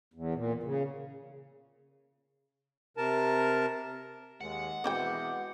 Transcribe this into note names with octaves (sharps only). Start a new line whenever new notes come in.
E2
A#2
C#3
C3 A#4 A5
D#2 G#3 F#5
B2 E3 G#3 C4 F#4 G5 D6 G6